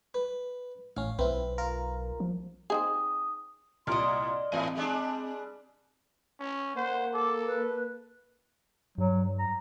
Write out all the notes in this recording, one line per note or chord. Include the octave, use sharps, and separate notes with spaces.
B4
A1 C#4 F5
B1 C4 E4 B4
F4 A#4
F3
C4 D#4 G#4 D#6
C2 A#2 D5 D#5 C6 F6
G#2 E3 B3 C4 D#7
G3 G#3 D4
C#4
A#3 C5 F#5
A4 D6
B4
G2 F#3
A#5